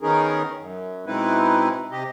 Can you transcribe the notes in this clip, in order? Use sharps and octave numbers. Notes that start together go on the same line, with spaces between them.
D#3 B3 C#4 D#4 G#4 A#4
F#2
B2 G#3 C4 D#4 E4 B4
C3 G4 D#5